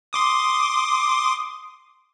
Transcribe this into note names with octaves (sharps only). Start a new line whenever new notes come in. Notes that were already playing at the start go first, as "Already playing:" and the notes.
C6 D6 D#6